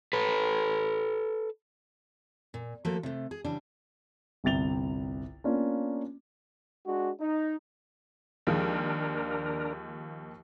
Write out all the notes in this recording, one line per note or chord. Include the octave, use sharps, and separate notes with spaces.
A4 B4
A#2
F3 A3 A#3 F#4 A4
C3 A3
G#4
C#3 E3 G3 D4
G1 C2 C3 A6 F7 G7
A#3 B3 C#4 D4 F4
G#3 D4 F#4
D#4
D#2 F3 G#3 D4 A#4